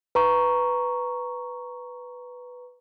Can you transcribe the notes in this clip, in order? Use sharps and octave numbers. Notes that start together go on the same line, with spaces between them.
B4 A#5 C#6